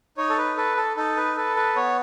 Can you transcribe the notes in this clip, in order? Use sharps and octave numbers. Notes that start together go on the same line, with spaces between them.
D#4 C#5
A4
B4
A4 B4
A4
D#4 A4
B4
A4 B4
B4
B3 C#5